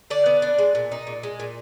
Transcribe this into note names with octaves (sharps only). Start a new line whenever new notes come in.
D3 D5
B3
D4
G#3
A#2
D#4
A#2
G#3
A#2